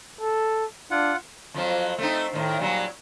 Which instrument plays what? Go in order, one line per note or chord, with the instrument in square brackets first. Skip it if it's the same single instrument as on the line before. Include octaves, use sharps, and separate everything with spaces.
[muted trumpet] A4
[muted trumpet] D4 [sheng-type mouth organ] F4 F#5
[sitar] F2 F3 F#3
A3 C4 D#4
A2 D#3
A#2 F#3 G3